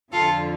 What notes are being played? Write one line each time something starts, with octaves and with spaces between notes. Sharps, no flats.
F2 D3 F3 F4 A4